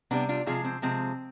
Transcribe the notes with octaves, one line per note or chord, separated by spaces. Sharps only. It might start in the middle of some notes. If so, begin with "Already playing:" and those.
C3 G3 B3 D4
D4 F4
C3 F3 G#3 F4 G#4
C4
C3 F3 G#3 C4